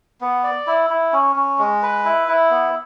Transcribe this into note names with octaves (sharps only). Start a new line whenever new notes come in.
B3
D5
E4
E4
C#4
C#4
G#3
B4
E4
E4
B3